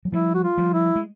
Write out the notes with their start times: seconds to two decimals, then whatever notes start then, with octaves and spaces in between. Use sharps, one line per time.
0.05 F#3
0.12 F3 G3 E4
0.34 F#4
0.43 F4
0.58 F3 G3
0.73 E4
0.96 G#3